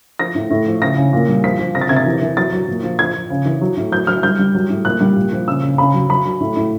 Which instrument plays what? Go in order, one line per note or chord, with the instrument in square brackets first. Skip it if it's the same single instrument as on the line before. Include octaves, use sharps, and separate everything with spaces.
[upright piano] F3 A#6
A2
A2
F3
C#3 A#6
C#3
A#2
G3
F3 B6
F3
C3 A#6
A6
C3 G#6
A6
E3
E3
F#3 A6
F#3
A#2
F3
F3 G#6
F3
C#3
E3
F#3
A2
F#3 G6
F#3 F6
G3 G6
G3
F#3
A2
A#2 F#6
G3
A#2
F3
C#3 E6
C#3
C#3 B5
F#3
F#3 B5
F#3
A2
A2